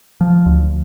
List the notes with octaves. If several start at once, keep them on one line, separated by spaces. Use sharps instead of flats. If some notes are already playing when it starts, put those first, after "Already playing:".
F3
D2